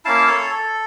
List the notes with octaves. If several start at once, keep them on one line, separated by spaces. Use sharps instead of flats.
A#3 C#4 E4 F5 A5
A4 C#5
A4